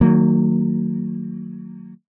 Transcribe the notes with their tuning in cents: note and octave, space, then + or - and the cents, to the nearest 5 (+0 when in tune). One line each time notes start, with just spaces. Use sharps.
D#3 +0 F#3 +0 A#3 -35